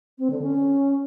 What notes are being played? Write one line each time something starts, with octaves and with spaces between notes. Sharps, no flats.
C4
D3
C#4